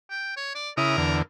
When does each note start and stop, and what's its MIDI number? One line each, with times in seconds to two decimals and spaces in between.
0.10 0.33 79
0.37 0.54 73
0.55 0.70 74
0.77 0.97 49
0.77 0.97 64
0.77 1.19 70
0.77 0.97 87
0.98 1.22 40
0.98 1.22 50